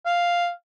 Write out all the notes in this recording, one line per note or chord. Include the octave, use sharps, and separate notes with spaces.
F5